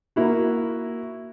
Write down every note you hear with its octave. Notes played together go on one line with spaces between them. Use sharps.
A#3 E4 F#4